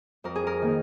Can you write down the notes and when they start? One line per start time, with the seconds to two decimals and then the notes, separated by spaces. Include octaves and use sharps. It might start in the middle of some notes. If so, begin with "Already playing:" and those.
0.24 F2 A#4
0.36 G#4
0.47 A#4
0.62 D#3 A#3